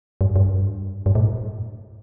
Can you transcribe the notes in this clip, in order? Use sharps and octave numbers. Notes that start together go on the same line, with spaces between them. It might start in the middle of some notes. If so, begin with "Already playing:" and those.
G2
G2
G2
A2